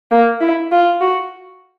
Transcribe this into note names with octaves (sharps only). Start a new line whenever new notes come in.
A#3
E4
F4
F#4